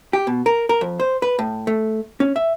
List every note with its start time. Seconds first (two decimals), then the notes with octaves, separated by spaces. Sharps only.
0.13 G4
0.27 B2
0.46 A#4
0.69 A#4
0.81 F2
1.00 C5
1.22 B4
1.39 A2
1.67 A3
2.20 C#4
2.36 E5